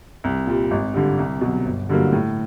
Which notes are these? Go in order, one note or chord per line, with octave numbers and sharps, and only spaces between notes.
C2
A#2 G3
G#1
G2 D3
C2
B2 F#3
G1
G2 D3 F#3 A#3
A2